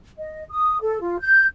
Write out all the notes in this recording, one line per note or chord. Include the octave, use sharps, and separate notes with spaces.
D#5
D#6
A4
F4
G6